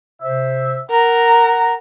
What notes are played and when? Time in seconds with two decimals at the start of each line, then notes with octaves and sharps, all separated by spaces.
0.21 C3 C5 E5
0.90 A#4 F#5 A#5